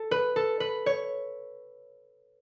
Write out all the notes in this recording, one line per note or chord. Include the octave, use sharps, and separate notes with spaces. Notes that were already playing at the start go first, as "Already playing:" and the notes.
Already playing: A4
B4
A4
B4
C#5